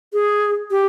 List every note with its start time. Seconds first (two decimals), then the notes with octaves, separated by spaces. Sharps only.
0.13 G#4
0.71 G4